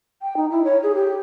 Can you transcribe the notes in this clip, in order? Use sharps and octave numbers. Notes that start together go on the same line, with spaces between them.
G5
D#4
E4
C#5
G#4
G4